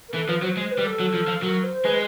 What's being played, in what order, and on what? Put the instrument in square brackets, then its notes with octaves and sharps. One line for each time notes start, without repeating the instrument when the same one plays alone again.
[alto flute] A#4
[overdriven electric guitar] E3 [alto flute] A4
[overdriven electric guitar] F3 [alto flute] B4
[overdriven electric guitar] F#3 [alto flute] C5
[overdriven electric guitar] G#3 [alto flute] C5
[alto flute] B4
[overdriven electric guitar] G3
[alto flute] A4
[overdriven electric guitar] F#3
F3
F3
[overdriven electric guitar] F#3 [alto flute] A#4
[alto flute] C5
[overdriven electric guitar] G#3 [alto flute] B4